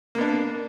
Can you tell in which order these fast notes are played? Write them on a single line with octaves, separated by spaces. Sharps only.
A#3 B3 D4